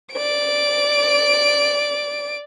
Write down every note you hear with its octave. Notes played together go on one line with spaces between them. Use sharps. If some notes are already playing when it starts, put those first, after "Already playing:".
D5 D7